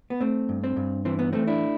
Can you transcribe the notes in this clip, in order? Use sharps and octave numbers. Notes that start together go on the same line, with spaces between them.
B3
A3 C4
G2
C4
G2
E3 C4
B3
A3 C4
D4 E4